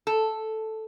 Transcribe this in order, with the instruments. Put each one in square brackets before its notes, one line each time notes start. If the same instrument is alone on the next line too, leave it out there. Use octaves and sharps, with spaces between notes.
[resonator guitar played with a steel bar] A4